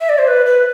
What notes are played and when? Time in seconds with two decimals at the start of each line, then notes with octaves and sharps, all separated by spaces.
0.01 E5
0.09 D5
0.18 C5
0.27 B4
0.46 B4